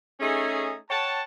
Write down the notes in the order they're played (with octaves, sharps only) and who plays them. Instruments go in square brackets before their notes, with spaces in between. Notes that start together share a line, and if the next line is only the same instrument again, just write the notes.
[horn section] A3 C#4 D#4 G#4
C#5 F#5 G5 A5